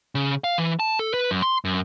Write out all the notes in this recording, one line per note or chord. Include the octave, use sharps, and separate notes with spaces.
C#3
F5
E3
A5
A4
B4
F#2
C6
F#2